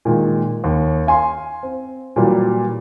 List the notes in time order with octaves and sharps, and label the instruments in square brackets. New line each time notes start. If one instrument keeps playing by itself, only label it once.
[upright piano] A#2 D#3 G#3
D#2
F5 G#5 C6
C4
A#2 E3 F#3 G3